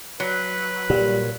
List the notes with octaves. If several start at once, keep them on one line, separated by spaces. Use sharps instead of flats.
F#3 B4
A#2 G3